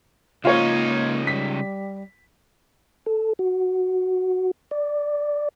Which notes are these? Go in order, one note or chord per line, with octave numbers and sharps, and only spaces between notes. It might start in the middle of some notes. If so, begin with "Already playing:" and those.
C#2 A#3 D#4 F4 C#5
G3 B6
A4
F#4
D5